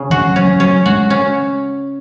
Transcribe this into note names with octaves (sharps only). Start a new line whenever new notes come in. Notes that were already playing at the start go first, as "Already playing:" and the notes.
Already playing: C#3
E3 F#4
F#3
C#4
F#3
F#3 C#4
G#3 F#4
C#4